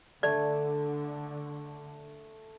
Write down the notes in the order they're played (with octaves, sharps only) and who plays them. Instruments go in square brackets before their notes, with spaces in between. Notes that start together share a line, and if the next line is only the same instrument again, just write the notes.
[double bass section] D3 [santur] A3 [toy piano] D5